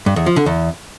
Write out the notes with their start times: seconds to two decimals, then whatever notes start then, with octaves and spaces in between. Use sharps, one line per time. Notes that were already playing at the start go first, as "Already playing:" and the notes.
0.06 G2
0.16 E2
0.26 F3
0.36 D3
0.46 E2